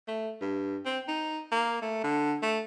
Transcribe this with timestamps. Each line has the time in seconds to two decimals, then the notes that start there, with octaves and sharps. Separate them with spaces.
0.08 A3
0.41 G2
0.85 C4
1.08 D#4
1.51 A#3
1.82 A3
2.03 D3
2.42 A3